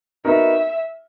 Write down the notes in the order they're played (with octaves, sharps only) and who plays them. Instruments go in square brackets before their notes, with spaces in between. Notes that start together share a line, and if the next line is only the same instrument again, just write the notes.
[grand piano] B3 D#4 F#4 A#4 [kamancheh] E5